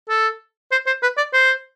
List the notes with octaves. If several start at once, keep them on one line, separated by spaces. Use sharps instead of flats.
A4
C5
C5
B4
D5
C5